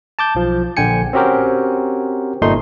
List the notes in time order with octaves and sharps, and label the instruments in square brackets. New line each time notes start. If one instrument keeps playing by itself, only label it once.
[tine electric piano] A5 D6 G6
B1 F3
A#1 D3 G5 G#5 C#7
C4 C#4 F#4 G4 A#4 C5
G1 A#2 A3 D#4 C6